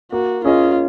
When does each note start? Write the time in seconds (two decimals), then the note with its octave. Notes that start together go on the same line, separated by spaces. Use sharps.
0.12 A#3 F#4
0.45 C#4 F4 G#4 D#5